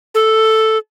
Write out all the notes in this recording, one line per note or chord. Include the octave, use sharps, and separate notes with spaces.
A4